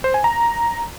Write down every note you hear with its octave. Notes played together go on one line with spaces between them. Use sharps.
C5
G#5
A#5